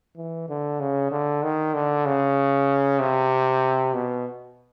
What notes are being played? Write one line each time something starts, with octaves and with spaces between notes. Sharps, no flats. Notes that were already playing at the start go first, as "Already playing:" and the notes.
E3
D3
C#3
D3
D#3
D3
C#3
C3
B2